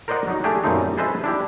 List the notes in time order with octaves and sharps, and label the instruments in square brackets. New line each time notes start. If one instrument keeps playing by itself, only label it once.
[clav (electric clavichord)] A#4 C5 D5 D#5 F#5
F#3 D#4
A3 D4 G4 G#4
F#2 A#2 G3 A3 C4 D#4
G#4 A4 B4 C5 D#5 E5
D4 E4 G4